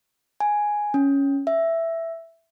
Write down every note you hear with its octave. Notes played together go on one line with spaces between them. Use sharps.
G#5
C#4
E5